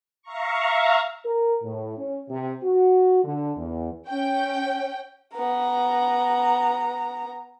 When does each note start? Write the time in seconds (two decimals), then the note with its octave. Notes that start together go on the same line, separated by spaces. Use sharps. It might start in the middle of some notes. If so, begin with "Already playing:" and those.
0.22 E5 F5 A#5 C#6
1.25 A#4
1.64 A2
1.98 C#4
2.29 C3
2.64 F#4
3.24 D3
3.57 E2
4.09 C#4 G5
5.35 B3 A#5